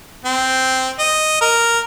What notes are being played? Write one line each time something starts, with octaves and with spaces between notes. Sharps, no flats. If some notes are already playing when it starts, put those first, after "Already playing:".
C4
D#5
A#4